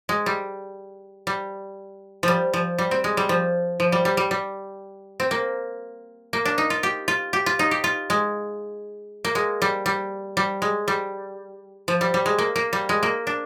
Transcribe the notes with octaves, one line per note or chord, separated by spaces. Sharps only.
G#3
G3
G3
F3 G3
F3
G3
C4
G#3
G3
F3
F3
G3
G3
G3
G3
C4
A#3
A#3
D4
D#4
F4
G4
F4
G4
F4
D#4
G4
F4
G#3
A#3
G#3
G3
G3
G3
G#3
G3
F3
G3
G3
G#3
A#3
A#3
G3
G#3
A#3
D4